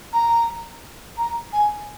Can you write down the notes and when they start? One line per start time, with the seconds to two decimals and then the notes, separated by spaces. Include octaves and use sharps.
0.13 A#5
1.17 A#5
1.53 G#5